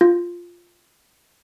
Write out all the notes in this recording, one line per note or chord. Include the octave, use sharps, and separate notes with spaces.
F4